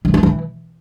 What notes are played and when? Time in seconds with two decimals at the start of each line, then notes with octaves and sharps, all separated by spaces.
0.05 G3
0.14 D#3
0.23 E3